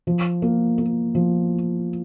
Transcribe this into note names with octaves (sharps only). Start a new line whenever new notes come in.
F3
A#3
A#3
F3